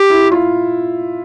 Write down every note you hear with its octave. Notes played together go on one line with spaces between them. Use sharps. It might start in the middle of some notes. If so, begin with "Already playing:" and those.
Already playing: G4
E4
F4